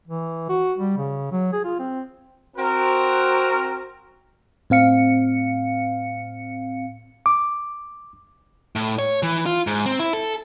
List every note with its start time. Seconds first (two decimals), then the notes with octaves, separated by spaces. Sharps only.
0.08 E3
0.49 F#4
0.78 G3
0.97 C#3
1.32 F#3
1.53 G#4
1.64 F4
1.79 C4
2.56 C4 F#4 A#4
4.70 A2 C4 F5 C#7
7.26 D6
8.76 A2
8.99 C#5
9.23 E3
9.46 F4
9.67 G#2
9.86 C4
9.99 E4
10.13 A4